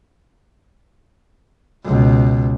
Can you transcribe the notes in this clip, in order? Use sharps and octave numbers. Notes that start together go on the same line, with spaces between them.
C#2 B2